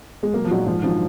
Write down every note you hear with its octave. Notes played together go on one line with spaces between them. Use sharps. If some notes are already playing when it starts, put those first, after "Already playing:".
G#3
B1 A#3
F3
A#2 F#3 G#3 D#4 F#4
G#2 F3
D#3 F3 F#3 D4